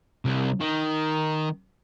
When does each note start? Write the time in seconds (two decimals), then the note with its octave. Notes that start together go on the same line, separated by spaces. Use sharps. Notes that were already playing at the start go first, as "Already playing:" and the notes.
0.25 C2
0.61 D#3